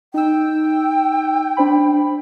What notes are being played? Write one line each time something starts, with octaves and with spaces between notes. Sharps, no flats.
D#4 G5 E6
D4 C5 B5